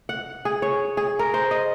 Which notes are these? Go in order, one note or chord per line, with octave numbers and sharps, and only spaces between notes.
F#5
G#4
C#5
G#4
A#4
C5
D#5